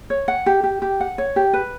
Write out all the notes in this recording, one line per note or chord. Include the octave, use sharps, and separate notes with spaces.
C#5
F#5
G4
G4
G4
F#5
C#5
G4
B4